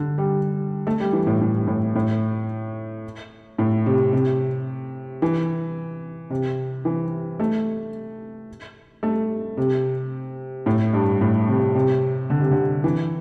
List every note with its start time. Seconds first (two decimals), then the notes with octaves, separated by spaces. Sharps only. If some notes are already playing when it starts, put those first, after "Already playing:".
Already playing: D3
0.18 G3
0.87 A3
1.00 G3
1.13 E3
1.27 A2
1.41 A2
1.67 A2
1.95 A2
3.58 A2
3.86 C3
4.13 C3
5.22 E3
6.30 C3
6.85 E3
7.40 A3
9.03 A3
9.57 C3
10.66 A2
10.93 G2
11.21 A2
11.48 C3
11.75 C3
12.30 D3
12.41 C3
12.51 D3
12.84 E3